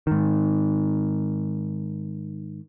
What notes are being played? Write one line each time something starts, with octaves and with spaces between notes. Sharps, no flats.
G#2 D#3